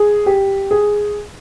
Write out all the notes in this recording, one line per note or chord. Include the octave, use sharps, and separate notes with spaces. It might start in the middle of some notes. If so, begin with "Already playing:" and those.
Already playing: G#4
G4
G#4